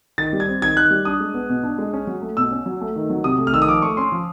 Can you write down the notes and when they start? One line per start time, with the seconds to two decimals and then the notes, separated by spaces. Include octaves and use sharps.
0.18 D#3 A6
0.33 G3
0.40 G#6
0.48 C4
0.62 D#3 G#6
0.77 D#3 F#6
0.91 G3
1.05 D4 D#6
1.20 G#3
1.34 B3
1.49 B2
1.63 D4
1.78 G#3
1.93 C#4
2.07 F#3
2.22 A3
2.37 B2 E6
2.52 C#4
2.66 F#3
2.81 A3
2.96 D#3
3.10 F#3
3.24 C3 D#6
3.39 A3
3.47 F6
3.53 D#3 E6
3.62 D#6
3.68 F3 D6
3.82 A3 C#6
3.97 C#4 C6
4.12 F3